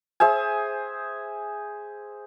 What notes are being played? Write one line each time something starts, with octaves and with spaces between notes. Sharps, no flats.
G#4 C5 E5 G#5